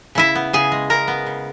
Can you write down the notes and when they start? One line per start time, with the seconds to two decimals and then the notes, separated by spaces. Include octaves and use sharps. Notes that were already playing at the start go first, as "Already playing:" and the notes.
0.15 C#3 E4 E5
0.35 B3
0.53 C#3 G#4 G#5
0.72 G#3
0.90 C#3 A#4 A#5
1.08 B3
1.26 C#3